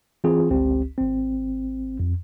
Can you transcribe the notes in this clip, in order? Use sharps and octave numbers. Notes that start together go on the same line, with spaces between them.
E3 C4 F4 G#4
G1 C#2 C4 G4
G#1 C4
F2